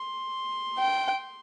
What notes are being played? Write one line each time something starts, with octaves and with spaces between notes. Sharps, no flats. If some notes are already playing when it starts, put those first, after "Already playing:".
Already playing: C6
G5